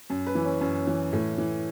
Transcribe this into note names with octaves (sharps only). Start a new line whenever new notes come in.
F#2
B4
E3
C#4
F#2 C#4
E3
A2
E3